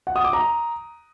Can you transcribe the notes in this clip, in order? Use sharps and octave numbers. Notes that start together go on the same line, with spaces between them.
F#5
D#6
D6
A#5